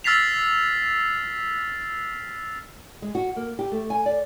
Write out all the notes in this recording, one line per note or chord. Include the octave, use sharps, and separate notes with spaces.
E6 F6 A6 B6 C7 F7
G#3
F#4
A#3
G4
A3
G#5
D5